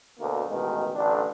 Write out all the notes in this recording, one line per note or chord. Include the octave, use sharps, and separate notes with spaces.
D2 B2 A3 A#3
A1 B2 D#3 G#3
A1 D3 D4